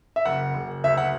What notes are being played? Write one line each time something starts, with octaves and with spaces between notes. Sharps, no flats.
E5
F#1 F#5
F#1
D2 E5
F#5